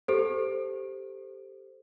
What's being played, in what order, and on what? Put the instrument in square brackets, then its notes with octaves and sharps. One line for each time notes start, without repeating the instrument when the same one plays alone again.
[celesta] G4 A4 C5